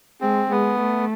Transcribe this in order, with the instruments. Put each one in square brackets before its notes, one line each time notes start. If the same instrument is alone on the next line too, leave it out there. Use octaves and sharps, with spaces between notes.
[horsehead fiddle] G#3 [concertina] C4
[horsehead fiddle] G#3 [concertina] B3
[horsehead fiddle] A3